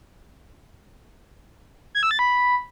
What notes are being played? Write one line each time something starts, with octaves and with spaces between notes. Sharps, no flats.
G#6
E6
A6
B5